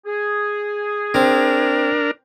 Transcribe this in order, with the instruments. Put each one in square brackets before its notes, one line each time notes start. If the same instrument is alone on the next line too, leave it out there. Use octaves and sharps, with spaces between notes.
[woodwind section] G#4
[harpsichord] C4 [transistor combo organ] D4 A#4